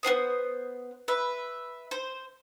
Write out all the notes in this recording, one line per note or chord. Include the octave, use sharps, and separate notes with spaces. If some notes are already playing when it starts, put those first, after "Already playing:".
B3 F4 C5 D#6
B4 E5
C5